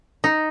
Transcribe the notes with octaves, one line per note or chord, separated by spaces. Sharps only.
D#4